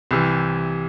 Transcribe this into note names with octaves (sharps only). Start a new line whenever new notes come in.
C2 C3 E3